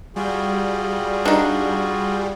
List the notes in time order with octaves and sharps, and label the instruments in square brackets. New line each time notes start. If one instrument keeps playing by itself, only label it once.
[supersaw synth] G3 [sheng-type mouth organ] F4 F#4 G#4
[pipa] D4 D#4